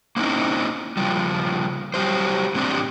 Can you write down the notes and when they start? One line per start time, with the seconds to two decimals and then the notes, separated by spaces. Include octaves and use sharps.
0.16 A#3 C4 C#4 D#4 E4
0.97 C#3 F3 G3
1.94 F#3 G3 G4 C5
2.55 A2 C4 D4 G4